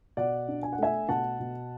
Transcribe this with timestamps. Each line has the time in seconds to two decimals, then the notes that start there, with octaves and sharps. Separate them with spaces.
0.17 B2 D5 F#5
0.48 D4
0.63 G#5
0.72 F#5
0.78 A3 E5 G#5
1.09 B2 F#5 A5
1.40 B2